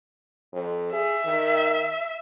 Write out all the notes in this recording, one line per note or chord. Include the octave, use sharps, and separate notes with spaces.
F2
G#4 E5
D#3